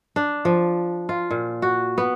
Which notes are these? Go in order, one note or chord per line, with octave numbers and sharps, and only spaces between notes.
D4
F3
F4
A#2
F#4
B3